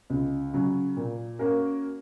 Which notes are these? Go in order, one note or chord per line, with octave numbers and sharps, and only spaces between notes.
C#2
C#3 F#3
A#2
A#3 C#4 F#4 A#4